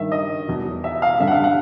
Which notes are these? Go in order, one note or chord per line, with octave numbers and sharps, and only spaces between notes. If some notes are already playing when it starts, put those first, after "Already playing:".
Already playing: G2 D#3 E5
D#5
E2 B2
E5
F5
G2 D3 E5
F#5
F5
F#5